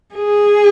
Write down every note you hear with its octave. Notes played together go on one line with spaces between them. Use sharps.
G#4